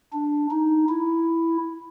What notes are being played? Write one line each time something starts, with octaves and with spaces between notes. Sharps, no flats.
D4
D#4
E4